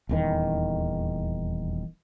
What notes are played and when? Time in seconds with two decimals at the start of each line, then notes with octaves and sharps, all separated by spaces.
0.09 D#1 E2 D#3